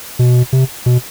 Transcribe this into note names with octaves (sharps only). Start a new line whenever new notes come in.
B2
C3
B2